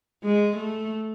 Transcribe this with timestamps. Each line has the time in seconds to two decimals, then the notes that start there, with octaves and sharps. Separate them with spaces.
0.24 G#3
0.56 A3